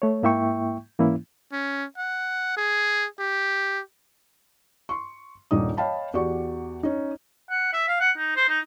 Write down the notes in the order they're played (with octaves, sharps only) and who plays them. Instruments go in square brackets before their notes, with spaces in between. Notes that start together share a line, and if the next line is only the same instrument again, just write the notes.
[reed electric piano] A3 C#5
G#2 A#3 E4 E5 G5 C#6
G#2 E3 A#3 C#4 E4
[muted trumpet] C#4
F#5
G#4
G4
[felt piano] C6 C#6
D#1 G2 A#2 D#4 D5 D#6
C#5 D#5 F5 G5 A5 B5
E2 F#4 G4 D5 C#6
C#4 D#4
[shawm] F#5
E5
F5
F#5
D#4
C5
D#4